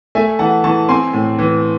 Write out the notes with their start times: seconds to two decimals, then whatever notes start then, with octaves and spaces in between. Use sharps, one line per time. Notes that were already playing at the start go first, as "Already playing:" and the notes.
0.15 A3 E5 G#5
0.39 E3 F#5 A5
0.64 E3 A5 C#6
0.89 C4 G#5 C6
1.13 A2
1.39 E3